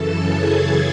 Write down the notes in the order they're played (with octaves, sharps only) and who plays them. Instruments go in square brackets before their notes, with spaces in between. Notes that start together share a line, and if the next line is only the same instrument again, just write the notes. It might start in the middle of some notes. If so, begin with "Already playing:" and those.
Already playing: [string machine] F#2 C#3 E3 A4 A5
G#4 G#5